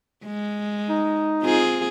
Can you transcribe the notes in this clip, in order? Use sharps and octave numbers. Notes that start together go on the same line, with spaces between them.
G#3
D#4
C4 F4 G#4